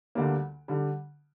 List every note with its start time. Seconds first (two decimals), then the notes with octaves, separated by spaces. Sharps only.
0.15 D2 D3 G3 A#3
0.68 D3 G3